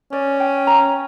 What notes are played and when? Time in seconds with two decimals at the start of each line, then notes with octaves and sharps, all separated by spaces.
0.12 C#4 D5
0.40 G5
0.67 A#5